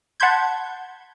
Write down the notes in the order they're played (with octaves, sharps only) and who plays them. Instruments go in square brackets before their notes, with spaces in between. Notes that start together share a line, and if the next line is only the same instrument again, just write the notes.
[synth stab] F#5 A5 B5 C6 G6 G#6